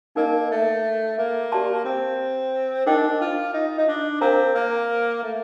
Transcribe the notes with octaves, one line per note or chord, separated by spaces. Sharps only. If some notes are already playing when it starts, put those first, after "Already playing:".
A#3 D#4 A#4 D#5
A3
A#3
G4 D5 A5 C6
C4
D4 D#4 A#4 D#5 G5
F4
D#4
D#4
D4
C4 A#4 F5 A#5
A#3
A3